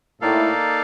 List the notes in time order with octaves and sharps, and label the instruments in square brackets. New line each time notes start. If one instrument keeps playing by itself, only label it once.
[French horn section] A2 [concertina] A#3 D#4 A4 D5 F5